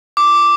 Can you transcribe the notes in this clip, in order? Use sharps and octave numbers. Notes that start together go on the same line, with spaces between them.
D6